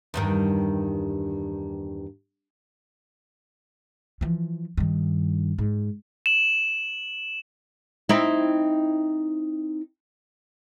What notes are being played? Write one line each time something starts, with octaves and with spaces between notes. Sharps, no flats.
E2 G2 D#3
E3 F3
G2 D#3
G#2
E7 F#7
C4 D#4 E4